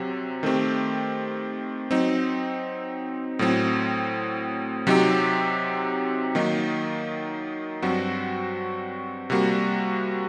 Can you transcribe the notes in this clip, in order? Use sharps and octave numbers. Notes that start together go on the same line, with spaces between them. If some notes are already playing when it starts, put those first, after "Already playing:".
Already playing: C3 F#3 C4
D#3 A3 C4 G4
F#3 C4 D#4
A2 F#3 C4
C3 F#3 C4 D#4 G4
D#3 F#3 A#3 D#4
G2 F#3 C4 F#4
C3 G3 A#3 F#4